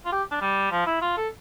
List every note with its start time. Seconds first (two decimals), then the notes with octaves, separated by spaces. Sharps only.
0.05 F4
0.12 G4
0.31 D4
0.42 G3
0.71 F3
0.87 E4
1.02 F4
1.17 A4